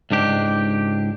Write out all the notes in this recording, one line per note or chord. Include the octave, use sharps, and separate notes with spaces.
C#2 G#2 D4 G4